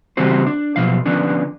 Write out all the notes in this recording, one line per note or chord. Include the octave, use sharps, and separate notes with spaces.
C#3 E3 G3 C4 F#4 C5
D4
B2 F3 F#3 F5
D3 F3 B3 C#4 D4